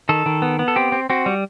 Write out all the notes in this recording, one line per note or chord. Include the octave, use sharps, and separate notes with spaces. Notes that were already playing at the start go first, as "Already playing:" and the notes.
D#3 A4
D#3
B3
B3
A4
C4 G4
C4
C4 F#4
G3